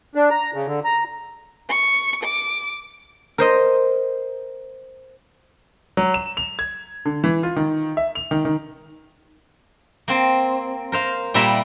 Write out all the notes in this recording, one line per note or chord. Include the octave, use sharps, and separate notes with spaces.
D4
A#5
C#3
D3
A#5
C#6
D6
A#4 C5 D#5
F#3
E7
F7
G#6
D3
E3
F4
D#3
E5
F7
D#3
D#3
A#3 C4
A#4 C5 F5
A#2 G3 A#3 E5 A#5 B5